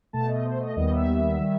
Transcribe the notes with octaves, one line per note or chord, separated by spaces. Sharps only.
B2 A3 A5
D#5
C5
D#5
D#2 D#3 G3 B3 D#5
E5
D#3 G3